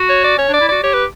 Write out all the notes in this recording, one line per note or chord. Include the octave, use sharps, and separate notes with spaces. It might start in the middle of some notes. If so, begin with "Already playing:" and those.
Already playing: F#4
C#5
D5
C#4 C#5
D4
D5
E4
F#4 D5
G4 C#5
B4